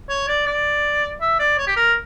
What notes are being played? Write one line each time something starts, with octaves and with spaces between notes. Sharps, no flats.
C#5
D5
D5
E5
D5
C#5
G4
A#4